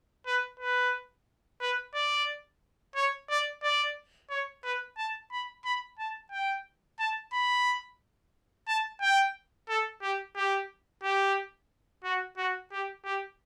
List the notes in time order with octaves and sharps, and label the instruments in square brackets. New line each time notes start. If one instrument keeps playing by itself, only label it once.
[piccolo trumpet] B4
B4
B4
D5
C#5
D5
D5
C#5
B4
A5
B5
B5
A5
G5
A5
B5
A5
G5
A4
G4
G4
G4
F#4
F#4
G4
G4